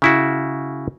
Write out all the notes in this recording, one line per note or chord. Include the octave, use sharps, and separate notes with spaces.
C#3 E4 F#4